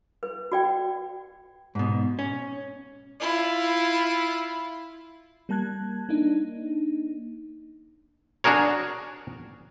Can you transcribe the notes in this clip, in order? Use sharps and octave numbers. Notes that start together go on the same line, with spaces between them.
B4
F#4 D5 G5
G#2 B2
C#4
E4 F4
G3 A#3 A5 F#6 G#6
A#3 D4 D#4
D4 F#4 G#4 A#4 C#5